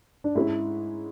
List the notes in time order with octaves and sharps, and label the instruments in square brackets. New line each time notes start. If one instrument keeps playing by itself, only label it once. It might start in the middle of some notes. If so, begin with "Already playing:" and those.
[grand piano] D4
[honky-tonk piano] G#2 G#3 C#4 [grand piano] E4